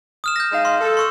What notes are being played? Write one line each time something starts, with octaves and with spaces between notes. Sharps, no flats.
D#6 F6 E7
G6 A#6
G#3 D#4 F5
C6
A4
C6 C#6 E6